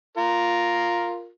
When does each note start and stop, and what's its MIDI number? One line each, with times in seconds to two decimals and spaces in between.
0.17 1.28 65
0.17 1.28 70